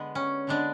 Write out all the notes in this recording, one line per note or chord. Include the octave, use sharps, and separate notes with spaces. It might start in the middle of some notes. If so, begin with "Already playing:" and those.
Already playing: D3 G#3 B3
C#4
D3 G#3 B3 D4